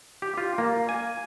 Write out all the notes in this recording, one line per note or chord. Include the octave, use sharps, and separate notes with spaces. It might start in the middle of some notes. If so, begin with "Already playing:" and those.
G4
F4
A#3
G#5